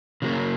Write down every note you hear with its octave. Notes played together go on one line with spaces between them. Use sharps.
C#3 F#3 A#3 C#4